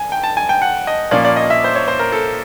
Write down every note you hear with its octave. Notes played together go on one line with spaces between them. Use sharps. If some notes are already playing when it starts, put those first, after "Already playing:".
Already playing: G#5
G5
A5
G#5
G5
F#5
D#5
A#2 F3 A#3 C#4 D5
D5
D#5
E5
C5
C#5
C5
A#4
A4